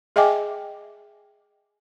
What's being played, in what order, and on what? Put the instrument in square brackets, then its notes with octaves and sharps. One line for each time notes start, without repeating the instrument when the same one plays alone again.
[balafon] G#4 D#5 E5 G5 G#5 D6